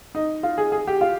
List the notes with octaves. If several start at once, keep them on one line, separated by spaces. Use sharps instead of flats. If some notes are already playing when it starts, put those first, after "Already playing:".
D#4
F4
G#4
G#4
G4
F4